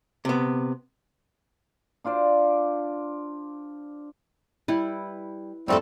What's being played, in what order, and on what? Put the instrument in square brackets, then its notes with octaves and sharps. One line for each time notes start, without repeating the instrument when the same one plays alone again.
[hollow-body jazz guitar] C3 B3
[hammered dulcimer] D4 F4 C5 D5
[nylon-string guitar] G3 [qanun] E4 B4
[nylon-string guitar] F2 F#4 A4 [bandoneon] G3 A3 C4